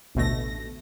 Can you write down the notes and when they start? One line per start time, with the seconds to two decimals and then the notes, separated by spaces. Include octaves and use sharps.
0.15 A1 D2 B2 A3 A#6